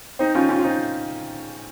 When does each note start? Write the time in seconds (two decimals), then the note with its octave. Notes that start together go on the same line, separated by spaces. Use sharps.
0.19 C4 D#4
0.35 C#4 F4
0.49 C#4 F4
0.59 F4
0.64 C4 D#4